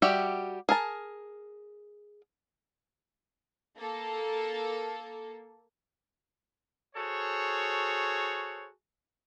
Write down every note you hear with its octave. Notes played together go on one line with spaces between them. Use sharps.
G3 F#4 G4 E5 G5
G#4 A#4 A5
A#3 A4
F#4 G#4 A4 C5 C#5